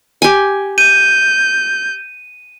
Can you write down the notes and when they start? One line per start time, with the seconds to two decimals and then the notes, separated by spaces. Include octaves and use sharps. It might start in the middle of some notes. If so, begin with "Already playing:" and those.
0.22 G4 G#5
0.78 G6 D#7